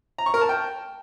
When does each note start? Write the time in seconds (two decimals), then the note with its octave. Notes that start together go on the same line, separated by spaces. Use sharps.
0.18 A#5
0.26 C#6
0.34 A#4
0.41 A5
0.49 G5